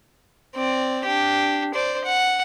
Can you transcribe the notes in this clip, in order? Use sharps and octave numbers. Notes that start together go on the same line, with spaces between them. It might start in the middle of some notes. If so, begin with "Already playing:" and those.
C4 D5
D4 G4
C5 D5
F#5